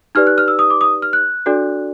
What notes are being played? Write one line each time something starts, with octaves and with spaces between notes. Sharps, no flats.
D#4 G4 B4 D5 F6
F#6
F6
E6
D#6
D6
D#6
F6
F#6
D4 F#4 A4 D5